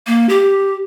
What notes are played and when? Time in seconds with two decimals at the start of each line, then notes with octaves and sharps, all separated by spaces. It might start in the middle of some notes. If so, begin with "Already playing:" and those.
0.07 A#3
0.29 G4